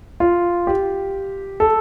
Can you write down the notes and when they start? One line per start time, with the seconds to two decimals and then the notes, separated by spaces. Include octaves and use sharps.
0.20 F4
0.67 G4
1.60 A4